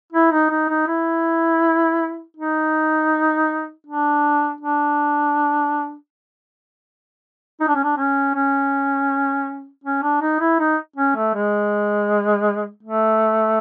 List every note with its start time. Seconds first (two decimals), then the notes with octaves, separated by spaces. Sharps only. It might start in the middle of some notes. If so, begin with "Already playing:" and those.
0.12 E4
0.32 D#4
0.50 D#4
0.69 D#4
0.87 E4
2.37 D#4
3.87 D4
4.61 D4
7.61 D#4
7.68 D4
7.75 C#4
7.84 D4
7.97 C#4
8.35 C#4
9.84 C#4
10.03 D4
10.21 D#4
10.40 E4
10.60 D#4
10.96 C#4
11.16 A3
11.34 G#3
12.83 A3